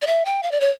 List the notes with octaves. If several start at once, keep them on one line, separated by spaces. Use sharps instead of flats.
D5
E5
G5
F5
D5
C#5